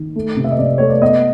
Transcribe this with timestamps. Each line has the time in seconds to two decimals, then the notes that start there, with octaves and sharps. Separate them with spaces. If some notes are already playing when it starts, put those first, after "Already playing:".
Already playing: D#3
0.16 A3
0.37 C3
0.44 E5
0.51 D#5
0.58 C3 D5
0.78 A3 C#5
0.90 D5
1.01 B3 D#5